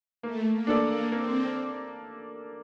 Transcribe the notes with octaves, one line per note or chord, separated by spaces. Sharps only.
A3 A#3
A#3
D4 A4 D5
A#3
A#3 C4